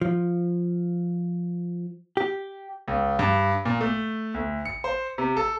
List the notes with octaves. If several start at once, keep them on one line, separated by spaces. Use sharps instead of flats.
F3
G4
C#2
G2
A#2
A3
D2
C#7
C5
C3
A4